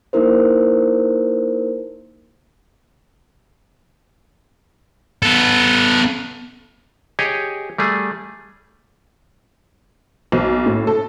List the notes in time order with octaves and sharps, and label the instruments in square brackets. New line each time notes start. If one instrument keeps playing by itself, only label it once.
[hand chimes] A#3 D#4 E4 A#4 C5
[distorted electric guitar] B3 A4
[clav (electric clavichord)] G4 G#4 C#5 D#5
G3 A3 G#4
[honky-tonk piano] B1
A2
A4